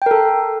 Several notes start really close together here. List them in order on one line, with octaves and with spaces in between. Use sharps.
G5 A#4 A4